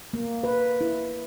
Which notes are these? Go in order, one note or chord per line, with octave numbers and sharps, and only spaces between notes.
A#3
B4
E4